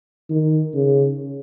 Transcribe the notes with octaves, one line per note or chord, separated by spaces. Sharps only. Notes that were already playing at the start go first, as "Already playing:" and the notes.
D#3
C#3